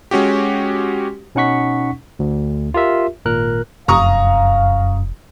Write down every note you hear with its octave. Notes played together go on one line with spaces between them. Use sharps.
G#3 C#4 F#4 G4
B2 C#4 D#4 F#5 C#6 B6
D2
F4 G4 A#4 E5
G#1 A#2 A#4 F#6
F1 F#2 F5 A#5 C#6 D#6